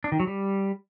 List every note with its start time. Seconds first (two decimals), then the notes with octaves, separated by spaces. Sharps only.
0.04 D4
0.12 D#3
0.20 F#3
0.27 G3